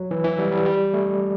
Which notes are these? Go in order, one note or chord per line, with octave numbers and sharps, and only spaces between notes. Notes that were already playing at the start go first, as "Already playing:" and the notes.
Already playing: F#3
E3
E3
G3
G3
G3
A3